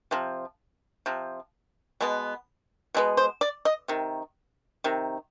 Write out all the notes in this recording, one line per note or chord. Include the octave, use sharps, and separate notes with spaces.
C3 F3
C3 F3
B2 G#3 B3
B2 G#3 B3
C5
D5
D#5
C3 D#3
C3 D#3